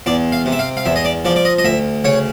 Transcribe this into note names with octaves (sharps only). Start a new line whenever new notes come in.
E2 D5
F5
C3
E5
F5
F5
E2 E5
D#5
D5
F3 D5
D5
D#5
D#5
D2 E5
C#3 C#5